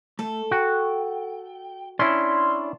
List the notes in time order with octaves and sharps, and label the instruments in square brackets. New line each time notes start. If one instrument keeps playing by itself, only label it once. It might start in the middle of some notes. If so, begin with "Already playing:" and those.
[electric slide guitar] A3 [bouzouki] A4
[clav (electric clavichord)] F#4 [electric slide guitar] G5
[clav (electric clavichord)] C#4 E4 [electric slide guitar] D4 D5 [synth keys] C6